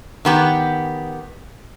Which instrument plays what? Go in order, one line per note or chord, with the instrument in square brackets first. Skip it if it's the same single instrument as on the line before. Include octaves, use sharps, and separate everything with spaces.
[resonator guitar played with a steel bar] D#3 B3 G4